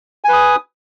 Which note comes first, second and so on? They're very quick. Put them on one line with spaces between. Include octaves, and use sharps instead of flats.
G#5 B4 D#6